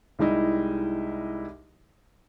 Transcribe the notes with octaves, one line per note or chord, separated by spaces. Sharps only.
C2 G3 G#3 D#4 E4 D#5